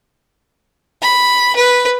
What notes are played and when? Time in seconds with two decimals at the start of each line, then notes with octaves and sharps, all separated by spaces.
1.02 B5
1.56 B4